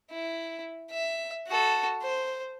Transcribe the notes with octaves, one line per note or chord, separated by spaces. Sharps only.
E4
E5
F#4 A4
C5